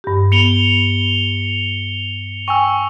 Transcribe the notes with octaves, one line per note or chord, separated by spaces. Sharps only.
G2 G4
B3 C#7 F7 G7
G5 G#5 C#6 E6